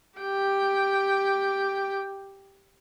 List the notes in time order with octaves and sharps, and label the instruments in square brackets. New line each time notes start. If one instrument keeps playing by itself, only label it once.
[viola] G4 G5